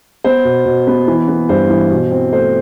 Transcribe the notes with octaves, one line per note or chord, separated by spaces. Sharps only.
B3 C5
B2
B2
B3
E3
B3
G2 C5
E3
B2
C4
A3 C5